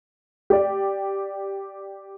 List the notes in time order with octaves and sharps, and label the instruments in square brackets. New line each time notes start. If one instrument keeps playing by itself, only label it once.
[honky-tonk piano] G4 D5